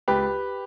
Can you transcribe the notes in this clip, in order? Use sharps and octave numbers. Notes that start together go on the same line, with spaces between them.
C#2 G4 B4